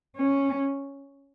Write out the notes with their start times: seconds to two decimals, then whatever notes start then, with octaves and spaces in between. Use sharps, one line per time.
0.16 C#4